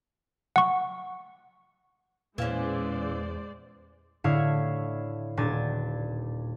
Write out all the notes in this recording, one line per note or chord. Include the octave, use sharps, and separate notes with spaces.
F#5 C#6
E2 A#2 E3 G#3 C#4 C5 D5 F5
A2 D3 E4 C#5 F5 G#6
D#1 A#2 D4 G#5 A6